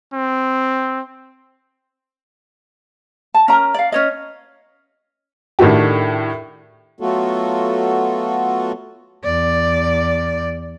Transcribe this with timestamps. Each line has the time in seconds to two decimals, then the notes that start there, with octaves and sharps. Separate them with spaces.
0.13 C4
3.34 A5
3.48 C#4 A#4 A#5
3.74 D5 F5
3.92 C#4 C#5 D#5
5.59 A2 D#3 A3 D4 F#4 G4
7.00 F#3 A3 B3 F4 F#4 A4
9.24 E2 D5